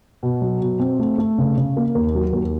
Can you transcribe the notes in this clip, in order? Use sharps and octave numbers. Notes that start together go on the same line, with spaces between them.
B2
F#3
B2
C4
A3
A3
C#3
C#3
A#3
D#2
F#3
D#2